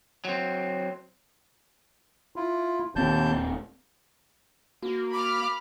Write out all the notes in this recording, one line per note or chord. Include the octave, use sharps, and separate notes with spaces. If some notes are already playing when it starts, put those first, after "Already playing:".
F#3 C4
E4 F4
D#1 D#2 C4 A5 G6
A#3 F#4
B5 D6 F6